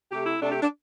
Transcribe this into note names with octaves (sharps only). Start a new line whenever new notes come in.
C3 A3 G4
E4
C3 A3 D4
G4
D4